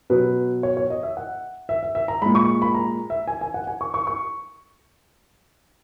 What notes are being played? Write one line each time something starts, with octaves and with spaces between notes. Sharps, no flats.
B2 F#3 B4
C#5
C#5
D#5
E5
F#5
E5
E5
E5
A#5
A#2 G#3 B5
C#6
B5
A#5
E5
G#5
G#5
F#5
G#5
C#6
C#6
C#6